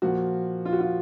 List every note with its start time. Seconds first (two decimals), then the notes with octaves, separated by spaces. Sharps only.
0.02 A#2 F3 F#4
0.65 F4
0.73 F#4
0.80 F4